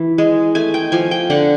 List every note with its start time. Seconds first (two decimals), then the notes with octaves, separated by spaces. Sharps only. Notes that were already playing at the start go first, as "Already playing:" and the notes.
Already playing: E3
0.18 G#3
0.55 A3 G#5
0.74 G5
0.92 F3 G#5
1.11 G5
1.30 D3 F#5